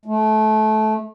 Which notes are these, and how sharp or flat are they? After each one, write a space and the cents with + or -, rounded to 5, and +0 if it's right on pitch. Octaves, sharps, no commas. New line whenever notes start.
A3 -25